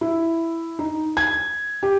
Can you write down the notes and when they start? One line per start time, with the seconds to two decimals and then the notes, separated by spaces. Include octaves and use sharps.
0.01 E4
0.79 D#4
1.17 G#6
1.83 G4